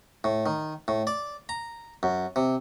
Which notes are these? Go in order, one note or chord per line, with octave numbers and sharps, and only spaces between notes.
A2
D#3
A2
D5
A#5
F#2
C3